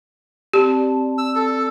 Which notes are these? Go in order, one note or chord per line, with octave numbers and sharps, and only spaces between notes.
C4 G4 D5 A5
E6
A4